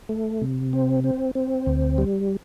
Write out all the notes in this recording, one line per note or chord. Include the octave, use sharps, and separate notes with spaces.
A3
C3
C4
C4
C4
D2
G3